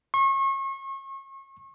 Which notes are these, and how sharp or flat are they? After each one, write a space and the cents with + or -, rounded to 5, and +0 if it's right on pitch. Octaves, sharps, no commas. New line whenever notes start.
C#6 -35